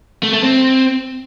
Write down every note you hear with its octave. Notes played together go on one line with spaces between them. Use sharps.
A3
A3
C4